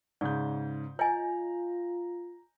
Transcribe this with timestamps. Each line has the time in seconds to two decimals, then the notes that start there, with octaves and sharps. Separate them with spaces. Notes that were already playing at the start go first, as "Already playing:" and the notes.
0.21 G#2 C#3 D5 G6
0.99 F4 C#5 D#5 G#5 A#5